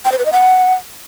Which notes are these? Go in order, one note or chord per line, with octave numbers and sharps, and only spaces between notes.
G5
C5
B4
D#5
F#5